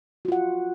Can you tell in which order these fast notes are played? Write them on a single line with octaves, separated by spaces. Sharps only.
F#4 F4 F#5